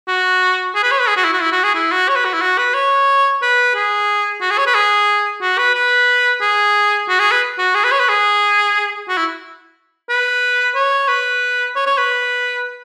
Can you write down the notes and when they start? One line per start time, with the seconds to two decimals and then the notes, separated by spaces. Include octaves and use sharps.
0.08 F#4
0.75 G#4
0.83 B4
0.91 C#5
1.00 B4
1.08 G#4
1.17 F#4
1.24 E4
1.33 F#4
1.42 E4
1.52 F#4
1.64 G#4
1.75 E4
1.92 F#4
2.09 C#5
2.16 B4
2.25 F#4
2.33 E4
2.41 F#4
2.58 B4
2.74 C#5
3.42 B4
3.75 G#4
4.41 F#4
4.51 G#4
4.58 C#5
4.67 B4
4.75 G#4
5.41 F#4
5.58 B4
5.75 B4
6.41 G#4
7.09 F#4
7.19 G#4
7.31 B4
7.58 F#4
7.75 G#4
7.84 B4
7.92 C#5
8.00 B4
8.09 G#4
9.08 F#4
9.17 E4
10.09 B4
10.75 C#5
11.08 B4
11.76 C#5
11.86 C#5
11.98 B4